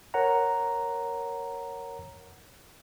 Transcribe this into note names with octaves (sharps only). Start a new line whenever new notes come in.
A#4 C#5 F#5 A#5